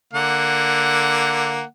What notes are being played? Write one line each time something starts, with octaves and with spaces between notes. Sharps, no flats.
D3 A#3 F#5